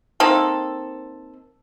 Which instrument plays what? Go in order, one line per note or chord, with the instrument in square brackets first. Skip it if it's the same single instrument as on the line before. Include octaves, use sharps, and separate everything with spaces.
[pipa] A#3 C4 D#4 A4